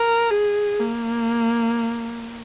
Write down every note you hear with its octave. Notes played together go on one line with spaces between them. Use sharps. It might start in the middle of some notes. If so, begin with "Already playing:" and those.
Already playing: A#4
G#4
A#3